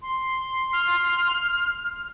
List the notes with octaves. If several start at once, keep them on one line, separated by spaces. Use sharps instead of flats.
C6
F6